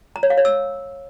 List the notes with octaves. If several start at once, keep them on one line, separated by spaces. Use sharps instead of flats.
A#5
C#5
F5
C#5
E6